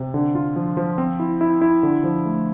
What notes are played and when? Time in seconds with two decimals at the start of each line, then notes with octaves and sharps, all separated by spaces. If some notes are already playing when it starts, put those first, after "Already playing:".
Already playing: C3
0.14 D3
0.35 F4
0.56 F3
0.77 F3
0.98 C4
1.20 E4
1.41 E4
1.61 E4
1.83 D3
2.04 F3
2.26 A3